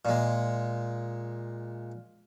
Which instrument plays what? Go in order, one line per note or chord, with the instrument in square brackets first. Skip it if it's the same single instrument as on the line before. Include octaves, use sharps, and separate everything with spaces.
[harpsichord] A#2 G#3